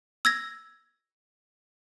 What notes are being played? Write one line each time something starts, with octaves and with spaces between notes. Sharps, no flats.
E6 G#6 A#6